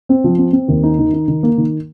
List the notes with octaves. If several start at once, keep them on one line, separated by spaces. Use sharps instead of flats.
C4
F3
C4
C4
D#2
D#4
D#3
D#4
D#3
A#3
D#3